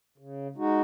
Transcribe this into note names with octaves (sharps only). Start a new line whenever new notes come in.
C#3
G#3 D#4 F#4